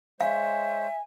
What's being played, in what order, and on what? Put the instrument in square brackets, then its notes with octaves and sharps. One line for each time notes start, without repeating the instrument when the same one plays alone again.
[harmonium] G#3 C5 C#5 [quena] E5 [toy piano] F5 [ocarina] G#5